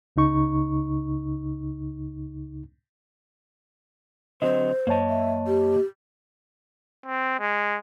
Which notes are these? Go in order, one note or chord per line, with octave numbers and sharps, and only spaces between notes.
C#2 C#3 D#4 C#6
D3 F#3 C4 C5 D#5
F#2 A#3 C#5 D#5 A5
E5
G4
C4
G#3